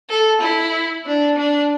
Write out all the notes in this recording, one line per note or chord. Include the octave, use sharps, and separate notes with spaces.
A4
E4
D4
D4